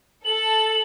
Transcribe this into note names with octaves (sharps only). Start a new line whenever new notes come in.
A4 F#7